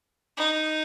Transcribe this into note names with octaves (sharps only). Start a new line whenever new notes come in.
D#4